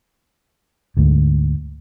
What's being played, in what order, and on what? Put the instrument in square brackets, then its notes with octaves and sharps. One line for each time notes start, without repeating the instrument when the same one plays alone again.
[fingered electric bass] D2 G#2